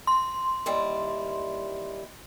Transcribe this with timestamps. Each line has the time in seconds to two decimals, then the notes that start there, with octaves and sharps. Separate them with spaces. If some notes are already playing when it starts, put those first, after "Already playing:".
0.07 C6
0.66 D#2 G3 E4